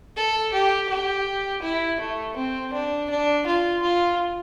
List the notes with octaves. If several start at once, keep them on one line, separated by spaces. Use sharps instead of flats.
A4
G4
G4
E4
A3
C4
D4
D4
F4
F4